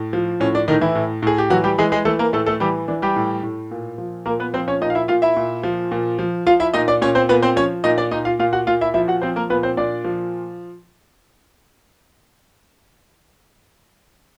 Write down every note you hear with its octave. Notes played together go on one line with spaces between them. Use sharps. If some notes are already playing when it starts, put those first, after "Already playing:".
Already playing: A2
F3
A2 C#4
D4
A2 D#3 D#4
E3 E4
A2
A2 G#4
G4
E3 F#3 F#4
G3 G4
E3 G#3 G#4
G#3 G#4
E3 A3 A4
A#3 A#4
A2 A3 A4
A3 A4
E3 G3 G4
E3 D4
G3 G4
A2
A2
A#2
F3
A#2 A#3 A#4
B3 B4
F3 C4 C5
C#4 C#5
A#2 D#4 D#5
F5
E4 E5
A#2 F4 F5
E4 E5
A#2
F3
A#2
F3
F3 F4 F5
E4 E5
A#2 D#4 D#5
D4 D5
A#2 C#4 C#5
C4 C5
A#2 B3 B4
C4 C5
F3 C#4 C#5
A#2 D#4 D#5
D4 D5
A#2 D#4 D#5
F4 F5
A#2 F4 F5
F#4 F#5
A#2 F4 F5
E4 E5
F3 E4 E5
F#4 F#5
F3 C4 C5
A#3 A#4
A#2 B3 B4
C4 C5
A#2 D4 D5
F3